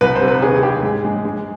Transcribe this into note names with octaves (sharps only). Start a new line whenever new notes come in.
C2 B4
C5
C3
B4
D#2 G#4
G#4
D#2 G4
G#2
G#3
G#3